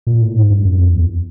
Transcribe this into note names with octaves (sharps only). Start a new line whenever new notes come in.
A#2
A2
G#2
G2
F#2
F2
E2